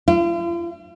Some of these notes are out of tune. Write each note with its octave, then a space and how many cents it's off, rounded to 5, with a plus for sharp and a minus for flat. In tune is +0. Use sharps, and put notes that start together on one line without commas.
F4 -45